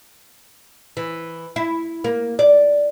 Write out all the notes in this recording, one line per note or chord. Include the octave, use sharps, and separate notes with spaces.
E3
E4
A#3
D5